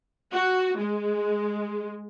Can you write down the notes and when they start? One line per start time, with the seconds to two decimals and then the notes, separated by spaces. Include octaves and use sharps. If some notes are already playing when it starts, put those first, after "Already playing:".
0.32 F#4
0.77 G#3